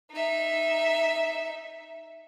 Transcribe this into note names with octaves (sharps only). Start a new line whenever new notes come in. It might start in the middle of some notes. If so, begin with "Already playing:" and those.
D#4 E5